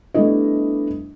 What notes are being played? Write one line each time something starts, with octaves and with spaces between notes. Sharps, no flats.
G3 A3 B3 D4 E4 D#5